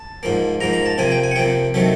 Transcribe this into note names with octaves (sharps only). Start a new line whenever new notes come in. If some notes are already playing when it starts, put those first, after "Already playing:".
Already playing: A5
G#2 F3 A#3
G#2 F3 A#3 A#5
A#5
A5
C3 F3 A#3 G#5
G5
G#5
F#5
C3 F3 A#3 G5
C3 D#3 F#3 A3